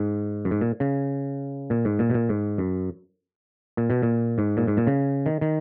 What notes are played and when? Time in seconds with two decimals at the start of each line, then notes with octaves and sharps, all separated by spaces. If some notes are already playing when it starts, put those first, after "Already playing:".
Already playing: G#2
0.45 F#2
0.51 G#2
0.61 A#2
0.80 C#3
1.70 A#2
1.85 G#2
1.99 A#2
2.10 B2
2.14 A#2
2.29 G#2
2.58 F#2
3.77 A#2
3.90 B2
4.03 A#2
4.38 G#2
4.57 A#2
4.67 G#2
4.77 A#2
4.87 C#3
5.26 D#3
5.41 D#3